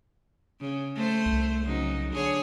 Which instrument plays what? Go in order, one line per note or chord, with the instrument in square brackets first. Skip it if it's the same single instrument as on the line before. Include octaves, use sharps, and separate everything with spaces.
[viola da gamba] C#3
A3 C5
[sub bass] C2
[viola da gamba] C#3 F#3 D#4
D3 G#4 C#5